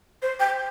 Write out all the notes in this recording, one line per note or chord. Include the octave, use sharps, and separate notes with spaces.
C5
G5